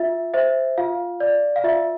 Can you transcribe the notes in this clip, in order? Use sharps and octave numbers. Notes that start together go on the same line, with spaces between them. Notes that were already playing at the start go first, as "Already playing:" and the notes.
Already playing: F4 E5
C5 E5
F4 F5
D5
F5
F4 E5